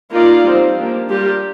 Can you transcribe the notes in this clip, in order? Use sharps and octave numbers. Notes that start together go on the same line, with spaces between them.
A#3 D#4 F4 A#4 D5
G3 C4 D#4 G4 C5
F3 A#3 D4 G4
G3 D4 F4 G4 A#4